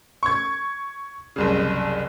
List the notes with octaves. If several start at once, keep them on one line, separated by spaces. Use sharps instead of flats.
C#6 G#6
F#1 C2 C#3